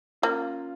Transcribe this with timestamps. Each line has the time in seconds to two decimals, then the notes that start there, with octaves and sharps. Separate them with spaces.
0.22 A#3 C#4 F4